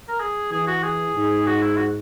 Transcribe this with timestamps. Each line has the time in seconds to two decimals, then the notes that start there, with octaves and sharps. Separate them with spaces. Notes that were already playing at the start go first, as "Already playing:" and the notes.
0.09 A#4
0.20 G#4
0.52 E3 G#4
0.67 F#4
0.83 G#4
1.14 G#2
1.47 F#4
1.62 E4
1.77 F#4